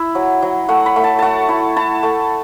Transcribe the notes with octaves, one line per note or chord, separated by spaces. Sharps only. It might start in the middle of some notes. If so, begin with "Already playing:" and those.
Already playing: E4 E5
F#3
F#3
A3 F#5
B5
A3
A5
A3 F#5 A5
E4
E4 A5
A3